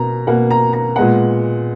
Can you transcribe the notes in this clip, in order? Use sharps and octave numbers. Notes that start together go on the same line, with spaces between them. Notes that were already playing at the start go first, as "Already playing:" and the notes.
Already playing: B2 A#3 A#5
B2 A#3 F#5
A#5
A#5
A#2 G#3 B3 F#5